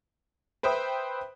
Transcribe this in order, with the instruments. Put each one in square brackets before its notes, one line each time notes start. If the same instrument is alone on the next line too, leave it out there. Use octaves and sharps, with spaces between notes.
[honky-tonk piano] B4 C5 E5 G5 D#6